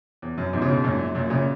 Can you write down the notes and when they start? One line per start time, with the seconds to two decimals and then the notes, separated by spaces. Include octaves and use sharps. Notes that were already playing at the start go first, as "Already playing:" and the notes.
0.22 E2
0.38 F#2
0.53 E2 G#2
0.61 C#3
0.69 G#2 B2
0.84 F#2 A#2
1.15 F#2 A#2
1.30 A#2 C#3